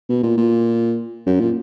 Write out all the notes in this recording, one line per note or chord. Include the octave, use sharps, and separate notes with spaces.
B2
A#2
A#2
F#2
A#2